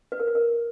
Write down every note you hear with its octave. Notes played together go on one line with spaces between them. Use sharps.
B4
A#4
B4
A#4